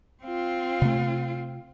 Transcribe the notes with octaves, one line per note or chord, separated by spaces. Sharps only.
C4 F4
C3 A3